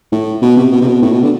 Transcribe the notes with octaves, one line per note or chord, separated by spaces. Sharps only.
A2
B2
C3
B2
C3
B2
A2
B2
D3